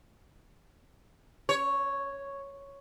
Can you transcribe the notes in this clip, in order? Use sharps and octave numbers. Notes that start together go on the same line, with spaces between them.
C#5